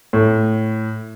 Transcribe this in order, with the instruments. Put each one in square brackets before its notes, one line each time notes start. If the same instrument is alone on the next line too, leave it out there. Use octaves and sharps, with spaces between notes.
[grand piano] A2